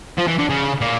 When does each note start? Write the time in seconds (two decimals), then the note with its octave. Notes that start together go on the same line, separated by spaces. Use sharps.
0.18 F3
0.28 E3
0.39 D3
0.50 C#3
0.81 A#2